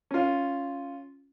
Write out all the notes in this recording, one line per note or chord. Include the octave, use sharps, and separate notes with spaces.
C#4 F4